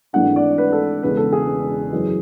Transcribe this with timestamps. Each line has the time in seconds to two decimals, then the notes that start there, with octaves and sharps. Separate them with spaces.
0.13 G#1 G#2 E3 A3 D4 F#5
0.36 D5
0.58 B4
0.72 A4
1.03 E1 E2 C#3 G#3 B4
1.17 A4
1.32 G#4
1.92 F#2 E3 G#3